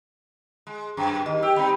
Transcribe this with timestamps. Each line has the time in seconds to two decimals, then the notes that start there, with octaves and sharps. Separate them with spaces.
0.67 G#3
0.97 F#2
1.26 D#2 D#5
1.43 G4 G5 E6
1.56 G3 C4 D#4 B5